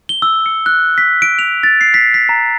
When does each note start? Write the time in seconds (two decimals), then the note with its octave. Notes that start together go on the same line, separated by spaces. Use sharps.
0.09 G7
0.22 E6
0.46 C#7
0.66 F#6
0.98 B6
1.22 D7
1.39 F7
1.63 A6
1.81 C7
1.94 B6
2.14 B6
2.29 A#5